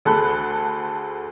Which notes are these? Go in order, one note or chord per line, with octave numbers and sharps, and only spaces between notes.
D2 G#4 A4 B5 F#6